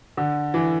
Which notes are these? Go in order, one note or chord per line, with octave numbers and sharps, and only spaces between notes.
D3
E3